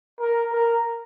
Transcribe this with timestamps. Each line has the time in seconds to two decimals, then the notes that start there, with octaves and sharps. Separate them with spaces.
0.20 A#4
0.53 A#4